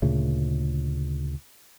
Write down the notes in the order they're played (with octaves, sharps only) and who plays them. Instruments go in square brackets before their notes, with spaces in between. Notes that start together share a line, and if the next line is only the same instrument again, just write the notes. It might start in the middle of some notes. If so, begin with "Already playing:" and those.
[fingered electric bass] D2 A#2 C#3 A3